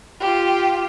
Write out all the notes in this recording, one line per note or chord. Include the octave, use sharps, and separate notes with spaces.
F4 G4